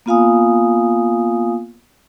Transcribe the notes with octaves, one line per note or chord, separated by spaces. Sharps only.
A#3 B3 F4 F5 G#5 D#6